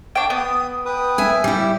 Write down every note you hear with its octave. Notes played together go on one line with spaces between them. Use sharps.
D4 G5 C#6
B3 D#6
B4 G5 D#6
E5 G#5
G3 E4 G4